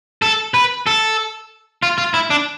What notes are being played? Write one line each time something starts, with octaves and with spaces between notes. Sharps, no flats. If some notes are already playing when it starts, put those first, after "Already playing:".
A4
B4
A4
F4
F4
E4
D4